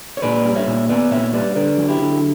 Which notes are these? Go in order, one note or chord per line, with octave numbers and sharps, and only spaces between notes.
C#5
A#2 B4 D5
G3
C#5 E5
A#2
B3 B4 D5
A#2 C#5 E5
G3 B4 D5
D3 B4 D5
F#3
E4 G4
D3